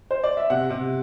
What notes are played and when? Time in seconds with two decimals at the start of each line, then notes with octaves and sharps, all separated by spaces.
0.11 C5
0.24 D5
0.37 E5
0.50 C3 F#5
0.70 C3